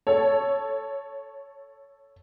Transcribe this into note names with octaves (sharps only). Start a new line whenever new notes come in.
A4 C#5